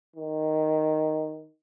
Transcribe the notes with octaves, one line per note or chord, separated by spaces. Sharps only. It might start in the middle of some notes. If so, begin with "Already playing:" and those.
D#3